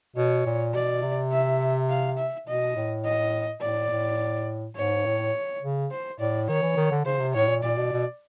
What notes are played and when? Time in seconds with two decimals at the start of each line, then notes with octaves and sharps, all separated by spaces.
0.16 B2 C#5
0.46 A#2
0.74 B2 D5
1.02 C3
1.32 E5
1.89 F5
2.17 E5
2.47 B2 D#5
2.76 A2
3.04 D#5
3.61 A2 D5
3.91 A2
4.76 G#2 C#5
5.05 A2
5.62 C#3
5.91 C5
6.19 A2 D5
6.48 D#3 C#5
6.62 E3
6.77 D#3
6.91 D3
7.05 C#3 C5
7.20 C3
7.34 A2 C#5
7.48 A#2
7.63 A#2 D5
7.77 B2
7.92 B2